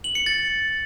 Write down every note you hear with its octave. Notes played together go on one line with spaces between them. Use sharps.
F#7
C#7
A6